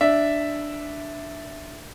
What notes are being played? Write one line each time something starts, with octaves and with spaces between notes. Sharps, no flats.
D4 E5